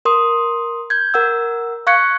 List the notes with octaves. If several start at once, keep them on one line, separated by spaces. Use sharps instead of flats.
A#4 C6 D#6
G6 G#6
A#4 F#5 E6
F5 C#6 F#6 G#6 C#7